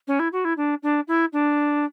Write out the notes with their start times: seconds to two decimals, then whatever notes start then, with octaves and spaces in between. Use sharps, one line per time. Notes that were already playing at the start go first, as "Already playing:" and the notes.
0.07 C#4
0.19 E4
0.32 F#4
0.44 E4
0.57 D4
0.83 D4
1.08 E4
1.33 D4